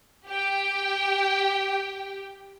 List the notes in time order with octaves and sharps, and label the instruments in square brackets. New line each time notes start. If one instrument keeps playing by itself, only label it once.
[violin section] G4 G5